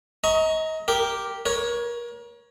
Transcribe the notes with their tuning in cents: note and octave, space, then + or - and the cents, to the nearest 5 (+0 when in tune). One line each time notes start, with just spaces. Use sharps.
D#5 +30 A#5 +0 C#6 +0
G4 +0 A#4 +0
A#4 +35 C#5 +0